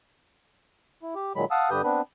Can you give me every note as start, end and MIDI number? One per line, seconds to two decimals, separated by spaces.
1.02 1.14 64
1.15 1.33 67
1.36 1.45 46
1.36 1.45 51
1.36 1.45 54
1.36 1.45 56
1.36 1.45 83
1.51 1.70 77
1.51 1.70 78
1.51 1.70 81
1.51 1.70 87
1.51 1.70 88
1.70 1.82 43
1.70 1.82 50
1.70 1.82 67
1.70 1.82 71
1.70 1.82 87
1.70 1.82 91
1.83 2.02 59
1.83 2.02 60
1.83 2.02 62
1.83 2.02 71